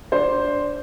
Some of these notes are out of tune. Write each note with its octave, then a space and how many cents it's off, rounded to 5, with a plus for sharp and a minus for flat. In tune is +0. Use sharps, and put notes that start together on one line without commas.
D4 -15 C5 +0